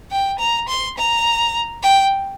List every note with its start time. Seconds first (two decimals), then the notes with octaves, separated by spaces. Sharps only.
0.11 G5
0.39 A#5
0.68 C6
0.97 A#5
1.82 G5